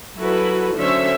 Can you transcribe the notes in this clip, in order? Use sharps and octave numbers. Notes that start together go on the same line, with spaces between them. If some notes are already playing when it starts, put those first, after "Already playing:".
F#3 E4 F#4 A4 B4
D3 F#3 C#4 C5 C#5 E5